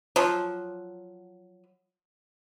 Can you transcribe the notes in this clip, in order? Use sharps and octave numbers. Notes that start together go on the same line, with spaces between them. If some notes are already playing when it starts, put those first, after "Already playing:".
F3 F#3